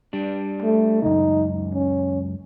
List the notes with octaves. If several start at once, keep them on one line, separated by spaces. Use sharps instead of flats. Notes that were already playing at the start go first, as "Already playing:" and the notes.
G3 D4
A3
C#2 F#2 D#4
C#4